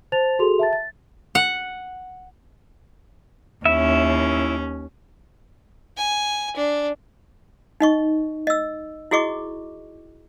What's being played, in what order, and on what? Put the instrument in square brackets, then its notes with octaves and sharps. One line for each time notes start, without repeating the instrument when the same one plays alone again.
[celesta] C5 A5 A6 F7
F#4 G#4 A4 C6 F7
E5 A5 A6
A6
[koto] F#5
[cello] D#2 C#4 [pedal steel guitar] E4 E5
[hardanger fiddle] G#5
D4
[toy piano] D#4 D#5 C#6
D#5 E6
E4 F#4 G#4 D#5 C#6 D6